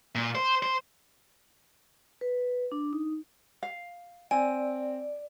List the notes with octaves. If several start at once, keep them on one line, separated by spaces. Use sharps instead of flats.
A#2
C5
C5
B4
D4
D#4
F5
C4 D5 G#5